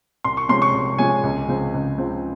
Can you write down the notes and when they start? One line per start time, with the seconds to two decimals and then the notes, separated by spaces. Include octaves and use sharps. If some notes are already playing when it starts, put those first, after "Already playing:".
0.24 C2 C6
0.37 C#6
0.49 C3 F3 G#3 C#4 C6
0.62 C#6
0.74 C2
0.98 C3 F3 G#3 C#4 G#5
1.23 C#2
1.48 C#3 F3 C4
1.74 C#2
1.98 C#3 F3 C4